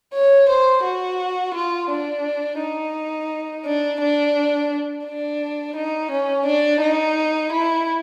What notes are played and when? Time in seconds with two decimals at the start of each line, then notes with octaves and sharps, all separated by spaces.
0.14 C#5
0.49 C5
0.84 F#4
1.55 F4
1.90 D4
2.60 D#4
3.65 D4
4.01 D4
5.06 D4
5.76 D#4
6.12 C#4
6.46 D4
6.81 D#4
7.53 E4